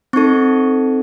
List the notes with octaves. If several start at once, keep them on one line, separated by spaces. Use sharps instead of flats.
C4 D#4 A4 C#6